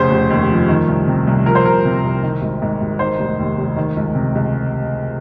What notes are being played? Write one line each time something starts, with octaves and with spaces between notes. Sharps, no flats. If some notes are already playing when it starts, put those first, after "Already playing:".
Already playing: F1 C#3 C5
F1
D#2
F3
D#3
C2
C3
C2
F3 A#4
C5
C2 A#4
C3
C2
D#3
G#1
G#2
G#1
D#3 C5
F1
D#2
F1
D#3
C#2
C3
C#2